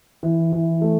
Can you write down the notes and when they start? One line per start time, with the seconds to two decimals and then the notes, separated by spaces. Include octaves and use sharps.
0.23 E3
0.52 E3
0.81 A3